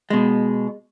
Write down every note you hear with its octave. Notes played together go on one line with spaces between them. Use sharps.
B2 G#3